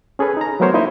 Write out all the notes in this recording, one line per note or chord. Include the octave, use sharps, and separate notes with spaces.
C#4 G#4 A4 B4
D#4 A#5
F#3 A3 B3 A#4 C5 C#5
A#3 D#4 E4 C5 D#5 E5